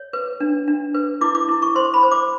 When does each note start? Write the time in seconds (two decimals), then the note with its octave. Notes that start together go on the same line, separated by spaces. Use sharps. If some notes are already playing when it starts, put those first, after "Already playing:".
Already playing: C#5
0.13 B4
0.40 D4
0.68 D4
0.94 B4
1.21 E4 D6
1.35 D6
1.49 E4
1.62 C#6
1.75 C5 C6
1.94 B5
2.03 C5
2.12 D6